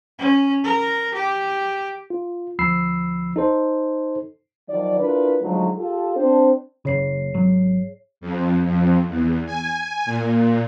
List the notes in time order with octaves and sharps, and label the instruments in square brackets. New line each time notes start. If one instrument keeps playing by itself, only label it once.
[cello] C#4
A#4
G4
[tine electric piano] F4
D2 F3 B5 E6 C7
D#4 A4 C5
[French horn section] D#3 F3 F#3 D5
D4 E4 F4 A#4 B4
D3 F3 F#3 G#3 A3 D#4
F4 G4 A4
C4 D4 C5
[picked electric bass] F#1 C#3 [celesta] G#4 C#5 C7
[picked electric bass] G#1 F#3
[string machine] F2
F2
E2
G#5
A#2